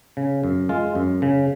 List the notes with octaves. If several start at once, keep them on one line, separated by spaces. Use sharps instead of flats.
C#3
F#2
G#3 F4
F#2
C#3